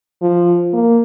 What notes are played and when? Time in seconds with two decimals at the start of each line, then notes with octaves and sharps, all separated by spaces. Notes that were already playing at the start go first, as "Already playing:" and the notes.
0.22 F3
0.73 A#3